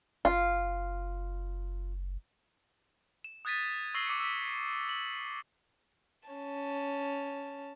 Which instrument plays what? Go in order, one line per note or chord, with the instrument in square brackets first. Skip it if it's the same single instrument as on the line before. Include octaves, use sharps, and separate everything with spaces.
[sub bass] F#1 [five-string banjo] F4
[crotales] E7
D#6 F#6 G#6 A6 B6 D#7
C#6 E6 A#6 C7 G7
D6 B6 C#7 D#7
E6 B6
F#7
[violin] C#4 A5